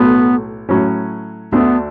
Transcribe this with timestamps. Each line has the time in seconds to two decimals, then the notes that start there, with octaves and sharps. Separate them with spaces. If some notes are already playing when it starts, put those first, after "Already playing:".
Already playing: B1 A2 F#3 A3 B3
0.69 A2 F#3 C#4
1.52 D2 D3 A3 B3 D4